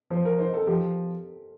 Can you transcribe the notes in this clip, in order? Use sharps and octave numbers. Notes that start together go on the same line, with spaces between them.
F3 C5
A#4
D#4 C5
A4
F3 G4